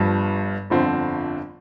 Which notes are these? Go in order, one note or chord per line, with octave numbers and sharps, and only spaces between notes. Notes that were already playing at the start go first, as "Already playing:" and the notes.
Already playing: G1 G2 F3
G1 F2 D3 F3 C4